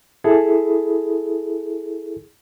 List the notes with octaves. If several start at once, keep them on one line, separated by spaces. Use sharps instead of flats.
E4 G#4 A4